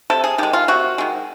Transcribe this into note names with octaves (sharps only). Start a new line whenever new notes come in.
C3 A4
G#4
D#3 G#3 G4
F4
C3 F#4
D#3 G#3